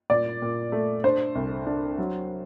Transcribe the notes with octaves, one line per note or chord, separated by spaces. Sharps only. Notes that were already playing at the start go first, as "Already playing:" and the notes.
A#2 D5
A#2
A3
D4 C5
C2
D4
F#3